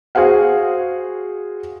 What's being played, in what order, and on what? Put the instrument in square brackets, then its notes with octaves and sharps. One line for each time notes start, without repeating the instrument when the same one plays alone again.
[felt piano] F#4 G#4 C5 F5 F#5